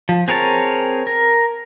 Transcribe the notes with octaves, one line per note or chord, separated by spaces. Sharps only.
F3
C4 G#4 A#4 C#5 A5
A#4